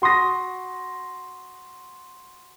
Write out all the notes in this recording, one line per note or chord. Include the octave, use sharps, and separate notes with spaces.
F#4 C6 D#6 A#6